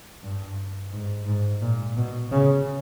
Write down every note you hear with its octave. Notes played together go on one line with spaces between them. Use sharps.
G2
G#2
G#2
A#2
B2
C#3